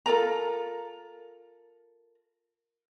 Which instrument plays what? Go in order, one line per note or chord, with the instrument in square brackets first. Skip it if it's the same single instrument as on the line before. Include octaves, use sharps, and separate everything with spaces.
[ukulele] F4 A4 A#4 A#5